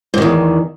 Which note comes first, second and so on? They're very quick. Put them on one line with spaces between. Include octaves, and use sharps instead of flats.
G#2 D#3 E2